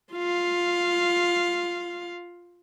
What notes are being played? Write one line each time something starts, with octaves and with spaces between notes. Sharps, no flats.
F4 F5